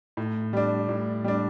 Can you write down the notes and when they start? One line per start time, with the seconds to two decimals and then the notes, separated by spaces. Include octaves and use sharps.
0.17 A2
0.53 G3 D4
0.89 A2
1.24 G3 D4